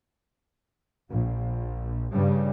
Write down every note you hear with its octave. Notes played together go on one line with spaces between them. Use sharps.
A#1
G2 C#3 G3